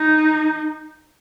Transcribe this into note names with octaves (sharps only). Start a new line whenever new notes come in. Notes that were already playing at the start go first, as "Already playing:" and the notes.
Already playing: D#4